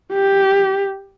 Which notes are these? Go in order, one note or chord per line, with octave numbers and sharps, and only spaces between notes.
G4